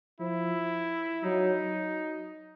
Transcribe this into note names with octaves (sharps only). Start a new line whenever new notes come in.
F3 E4
F#3 D#4